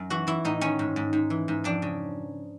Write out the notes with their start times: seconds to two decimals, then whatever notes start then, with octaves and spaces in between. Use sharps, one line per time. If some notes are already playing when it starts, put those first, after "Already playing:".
Already playing: F#2
0.10 E3 F#4
0.27 E3 E4
0.45 A2 D#4
0.61 D#3 C#4
0.79 G#2
0.96 G#2
1.13 G#2
1.30 E3
1.48 G#2
1.64 F2 D4
1.82 C#3